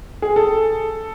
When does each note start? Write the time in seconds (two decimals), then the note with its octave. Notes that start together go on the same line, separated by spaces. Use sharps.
0.22 G#4
0.36 A4